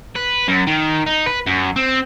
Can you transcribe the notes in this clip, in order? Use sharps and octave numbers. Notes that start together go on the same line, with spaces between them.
B4
F#2
D#3
D#4
B4
F#2
C4